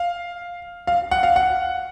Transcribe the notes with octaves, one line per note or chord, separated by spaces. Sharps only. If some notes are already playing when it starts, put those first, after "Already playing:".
Already playing: F5
F5
F#5
F5
F#5